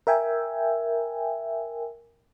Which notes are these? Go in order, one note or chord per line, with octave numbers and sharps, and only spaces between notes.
A#4 E5 G5 G#5